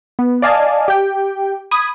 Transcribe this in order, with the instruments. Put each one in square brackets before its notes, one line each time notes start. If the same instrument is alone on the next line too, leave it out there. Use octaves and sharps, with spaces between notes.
[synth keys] B3
D5 D#5 F5 G#5 A5
G4 G5
B5 D#6 G#6